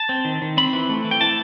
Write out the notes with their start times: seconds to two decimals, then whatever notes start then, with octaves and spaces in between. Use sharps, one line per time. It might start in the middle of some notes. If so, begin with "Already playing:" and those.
Already playing: A5
0.09 C4
0.25 D#3
0.42 D#3
0.57 C4 B5
0.73 E3
0.89 A3
1.05 E3
1.11 G5
1.21 E3 A5